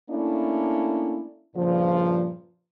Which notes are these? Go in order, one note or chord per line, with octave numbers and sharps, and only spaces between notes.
A3 A#3 C#4 D4 E4
G2 A#2 C#3 F3